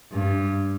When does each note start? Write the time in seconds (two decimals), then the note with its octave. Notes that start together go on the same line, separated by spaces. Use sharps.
0.12 G2